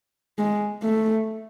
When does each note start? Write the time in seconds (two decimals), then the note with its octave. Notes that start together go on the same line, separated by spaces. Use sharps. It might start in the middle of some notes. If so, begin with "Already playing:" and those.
0.38 G#3
0.82 A3